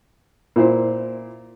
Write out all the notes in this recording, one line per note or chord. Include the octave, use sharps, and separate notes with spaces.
A#2 E4 C5